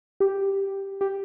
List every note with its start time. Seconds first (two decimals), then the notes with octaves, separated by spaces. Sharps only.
0.20 G4
1.01 G4